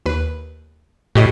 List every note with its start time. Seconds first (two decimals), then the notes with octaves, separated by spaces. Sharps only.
0.06 D#2 B4
1.15 A2 F#4 G4 D#5